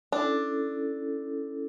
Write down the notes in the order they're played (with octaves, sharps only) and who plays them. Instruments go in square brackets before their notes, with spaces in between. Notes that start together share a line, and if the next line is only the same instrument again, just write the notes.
[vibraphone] C#4 E4 A4 [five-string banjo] D4